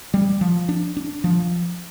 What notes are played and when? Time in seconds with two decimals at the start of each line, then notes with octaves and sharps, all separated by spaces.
0.14 G3
0.41 F3
0.69 D4
0.97 D4
1.24 F3